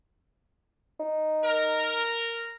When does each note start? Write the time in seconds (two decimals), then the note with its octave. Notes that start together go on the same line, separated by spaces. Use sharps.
1.00 D#4
1.45 A#4